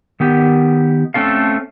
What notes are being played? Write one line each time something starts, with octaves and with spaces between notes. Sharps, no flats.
D#3 B3 G4
A3 C4 C#4 A4 F5